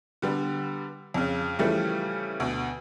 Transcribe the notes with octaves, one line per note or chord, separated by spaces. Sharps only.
D3 G3 B3
F2 C#3
C#3 E3 F3 G3 A3
D2 B2